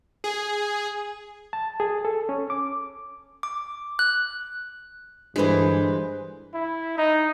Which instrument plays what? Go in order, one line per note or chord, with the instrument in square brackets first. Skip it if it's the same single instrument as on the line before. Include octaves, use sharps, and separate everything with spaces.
[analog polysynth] G#4
[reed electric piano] A5
G#4
A4
C#4
D6
[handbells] D6
F#6
[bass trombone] G2 [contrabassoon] D3 [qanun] E3 G#3 [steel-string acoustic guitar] G#4 B4 C5
[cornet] E4
D#4